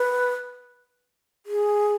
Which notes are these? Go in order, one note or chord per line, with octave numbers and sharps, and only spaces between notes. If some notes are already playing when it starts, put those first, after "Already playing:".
Already playing: B4
G#4